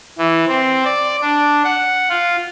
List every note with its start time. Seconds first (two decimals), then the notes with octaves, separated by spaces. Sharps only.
0.18 E3
0.48 C4
0.85 D5
1.21 D4
1.64 F#5
2.09 F4